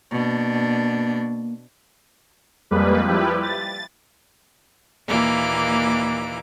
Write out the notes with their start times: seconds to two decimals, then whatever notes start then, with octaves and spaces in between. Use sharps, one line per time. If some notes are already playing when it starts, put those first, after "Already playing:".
0.12 B2 A#3 D4
2.71 F2 G3 G#3 A#3 B4
3.08 F3 G3 E4 G4 B4
3.43 A6
5.05 D#2 A#2 E3 A#3 D6